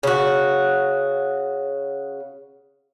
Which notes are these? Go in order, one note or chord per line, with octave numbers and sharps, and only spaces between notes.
C#3 F#4